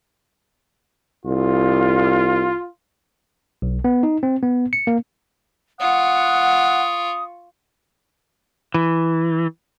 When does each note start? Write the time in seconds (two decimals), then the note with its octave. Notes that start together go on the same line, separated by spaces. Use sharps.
1.25 C2 F4
3.62 B1
3.85 B3
4.03 D#4
4.23 C4
4.43 B3
4.73 C#7
4.87 A#3
5.80 F4 F#5 C#6 D#6
8.74 E3